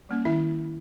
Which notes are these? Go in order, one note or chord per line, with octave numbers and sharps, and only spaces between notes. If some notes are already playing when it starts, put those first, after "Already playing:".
G3 A#3 C#4
D#3 E4 E5